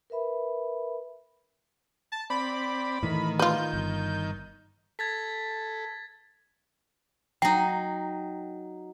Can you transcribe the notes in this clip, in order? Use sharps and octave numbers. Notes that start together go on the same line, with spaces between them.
A#4 B4 E5 B5
A5
C4 D5 B5
A2 D#3 E3 A3
F4 B4 G6
G1
A4 G#6 A6 B6
F#3 D#4 G5